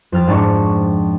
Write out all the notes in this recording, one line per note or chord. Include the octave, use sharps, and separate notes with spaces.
F2 F6 A6
G#2 D4 A5 C#6